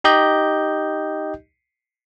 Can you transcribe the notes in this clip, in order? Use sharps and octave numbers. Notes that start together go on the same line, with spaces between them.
D#4 G4 D#5 G6